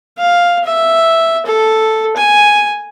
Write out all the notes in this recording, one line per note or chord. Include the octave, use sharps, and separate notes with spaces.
F5
E5
A4
G#5